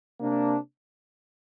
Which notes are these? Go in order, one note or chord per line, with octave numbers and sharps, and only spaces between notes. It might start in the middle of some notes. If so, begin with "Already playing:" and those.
C3 A#3 D4